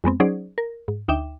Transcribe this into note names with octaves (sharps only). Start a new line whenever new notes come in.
F2 G#3 B3 C4
F#3 C#4 D#4 G#4 C5 D5
A#4
G#2
D2 D#4 E5 G5 D6 E7